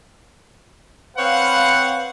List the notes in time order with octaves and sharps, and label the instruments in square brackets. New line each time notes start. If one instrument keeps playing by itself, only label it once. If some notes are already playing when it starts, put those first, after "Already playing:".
[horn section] C4 C#5 F#5 [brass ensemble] B4 F5